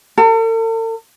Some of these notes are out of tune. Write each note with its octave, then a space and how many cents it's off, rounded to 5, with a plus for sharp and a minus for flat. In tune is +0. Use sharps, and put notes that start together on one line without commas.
A4 +45